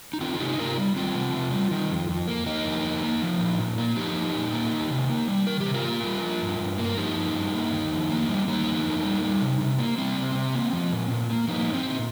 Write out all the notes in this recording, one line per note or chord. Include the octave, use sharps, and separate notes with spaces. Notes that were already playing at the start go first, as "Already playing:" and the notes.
D#4
D#3 C4 F4
F4
C3 D#4 G4
C3 F4 A#4
G3
D#3 C4 F4
C3
C3
G3
D#3
F2
F2
A#3
D#3 A#3 D#4
F2
F2
A#3
F3
A#2
A#2
A#3
F3 D#4 G4
A#2
A#2
A#3
D#3
C3
A#3
G3
D#3 A#4
G4
C3
F4 A#4
A#3
G3
F3
G2
G2
A#3
A#4
F3 D#4 G4
G2
G2
A#3
D#3
F2
A#3
G3
D#3 A#3 D#4
F2
A#3
G3
G3
C3
C3
A#3
G3 C4
C3
C3
A#3
F3
A#2
A#2
A#3
F3 A#3 D#4
A#2
C4
A#2